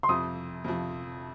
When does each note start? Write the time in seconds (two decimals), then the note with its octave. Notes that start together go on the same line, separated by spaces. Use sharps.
0.03 C6
0.09 F2 C3 F3 D#6
0.64 F2 C3 F3